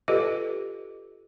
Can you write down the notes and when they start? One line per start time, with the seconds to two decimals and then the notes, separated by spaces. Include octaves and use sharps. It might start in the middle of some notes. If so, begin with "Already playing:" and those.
0.08 F4 G4 A4 B4 D5 D#5